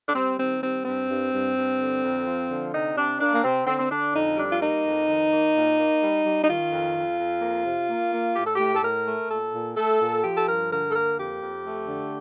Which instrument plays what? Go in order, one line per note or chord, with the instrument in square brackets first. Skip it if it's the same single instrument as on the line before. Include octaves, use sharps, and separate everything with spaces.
[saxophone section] D4
G3 C4
D#3 C4
G3 C4
G2 C4
G2
G2
G2
D3
F2
F3
D3
C3 D#4
C3 D4
A#3 D4
A#3
C3 C4
D3 C4
C4
D3 D4
F2 D#4
G3 D4
F4
A#3 D#4
F2
D#3
A#3
A#2
A#3
G3
G3
D#4
D#3 F4
F2
F2
F2
A#3
C3
A#3
A#3
A2 G4
A4
A2 G4
A4
A2 A#4
A3
A#2 A4
A#2
A3 A4
A#2
F3 G4
A4
G2 A#4
D3 A#4
A4
A#3 A#4
F2 G4
F2
A3
D3